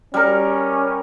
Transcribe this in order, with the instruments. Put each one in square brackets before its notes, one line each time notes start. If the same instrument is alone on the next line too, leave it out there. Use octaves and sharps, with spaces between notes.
[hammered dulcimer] G3 A#4 [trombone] C#4